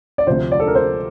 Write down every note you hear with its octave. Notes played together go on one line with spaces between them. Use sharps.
D5
D2 C3 F3 C5
D5
A4
A#4
C5